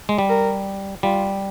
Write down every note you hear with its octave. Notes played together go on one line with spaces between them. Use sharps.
G#3
G3
A#4
G3 F4